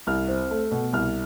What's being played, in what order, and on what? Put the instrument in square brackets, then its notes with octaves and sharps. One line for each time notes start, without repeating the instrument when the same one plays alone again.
[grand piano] C2 F6
C4
A3
B2
C2 F6